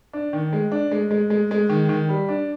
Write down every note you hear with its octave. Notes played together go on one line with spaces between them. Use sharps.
D4
D#3
G#3
D4
G#3
G#3
G#3
G#3
D#3
D#3
G3
D4